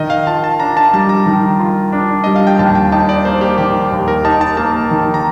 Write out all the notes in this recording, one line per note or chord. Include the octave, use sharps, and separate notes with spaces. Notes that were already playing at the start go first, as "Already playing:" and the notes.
Already playing: D#3 D#5
F5
F4 A5
A5
D4 A#5
A5
G3 A5
A#5
D#3
F4
D4
G3 D#5
F5
G5
D#2 A5
G5
D#4 A5
D5
A#3 C5
G4
D#3 G4
D#2
A#4
D#4 A5
A5
A#3 A5
D#3
A#5